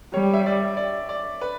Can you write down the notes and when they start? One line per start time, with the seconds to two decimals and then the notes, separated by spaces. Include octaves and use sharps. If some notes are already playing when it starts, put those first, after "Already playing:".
0.14 G3 C#5
0.34 E5
0.46 D5
0.77 D5
1.09 D5
1.41 B4